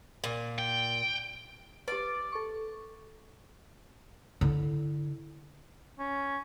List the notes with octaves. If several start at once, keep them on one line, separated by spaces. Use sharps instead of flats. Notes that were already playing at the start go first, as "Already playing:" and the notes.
A#2
G5
G4 B4 D5 A6
A4 C#6
D3 E4
C#4